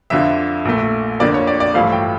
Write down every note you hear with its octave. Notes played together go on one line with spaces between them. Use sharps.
F2 D3 F3 E5
A#1 A#2 A3
F2 D3 F3 A#3 D5
C#5
D5
D5
A1 G2 F3 A3 F5
G5